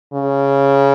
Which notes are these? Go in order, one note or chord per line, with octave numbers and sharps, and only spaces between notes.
C#3